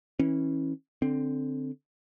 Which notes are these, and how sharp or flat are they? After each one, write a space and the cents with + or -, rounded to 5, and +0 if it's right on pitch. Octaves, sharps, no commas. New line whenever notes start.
E3 -25 C#4 -25
D3 +0 C4 +0